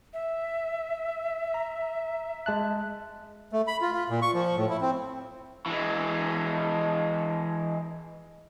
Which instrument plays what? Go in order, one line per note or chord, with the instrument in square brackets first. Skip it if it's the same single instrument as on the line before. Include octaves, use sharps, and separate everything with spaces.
[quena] E5
[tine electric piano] A#5
G#3 A5 F#6
[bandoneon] A3
B5
F4
F4
A#2
C#6
F3
A2
E4
C4
[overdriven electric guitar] E3 G#3